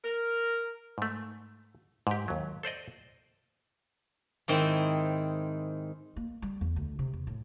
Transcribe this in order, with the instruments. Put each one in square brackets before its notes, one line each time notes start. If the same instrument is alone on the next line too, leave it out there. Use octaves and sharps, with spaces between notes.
[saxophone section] A#4
[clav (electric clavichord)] G#2 A3
G#2 G4
D#2 F#3
A4 C5 D5 D#5
[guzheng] G#2 D#3 C4 E4 G5
[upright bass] A#3
G3
E2
D2
C3
E2
A2